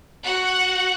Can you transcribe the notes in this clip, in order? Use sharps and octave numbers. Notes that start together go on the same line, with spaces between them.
F#4 F#5